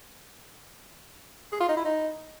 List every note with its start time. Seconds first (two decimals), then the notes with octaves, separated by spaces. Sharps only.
1.52 G#4
1.61 F4
1.69 D#4
1.77 E4
1.85 D#4